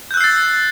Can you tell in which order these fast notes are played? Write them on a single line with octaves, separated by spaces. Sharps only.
G6 F#6 E6 C7 A6